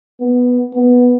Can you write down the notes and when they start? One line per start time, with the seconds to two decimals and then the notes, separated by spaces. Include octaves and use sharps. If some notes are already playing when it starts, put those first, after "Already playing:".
0.21 B3
0.75 B3